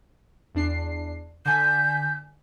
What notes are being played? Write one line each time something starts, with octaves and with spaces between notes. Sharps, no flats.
E2 D4 C7
D3 G#5 G6 B6